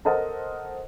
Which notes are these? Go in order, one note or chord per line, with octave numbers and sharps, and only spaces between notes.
A4 A#4 C5 D#5 F#5 A5